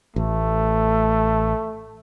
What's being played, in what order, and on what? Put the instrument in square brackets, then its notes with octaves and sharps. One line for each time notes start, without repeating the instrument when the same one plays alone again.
[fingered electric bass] A1 [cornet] A3